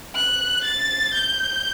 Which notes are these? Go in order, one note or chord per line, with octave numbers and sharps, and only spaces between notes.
F#6
A6
G6